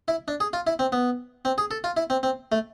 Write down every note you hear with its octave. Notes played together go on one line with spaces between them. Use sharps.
E4
D4
G#4
F4
E4
C4
B3
C4
G#4
A4
F4
E4
C4
C4
A3